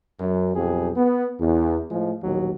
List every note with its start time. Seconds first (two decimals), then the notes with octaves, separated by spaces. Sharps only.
0.20 F#2
0.56 B1 F2 G4 G#4
0.97 B3
1.40 E2
1.91 A2 F3 G#3
2.24 A#1 D#2 B2 F#3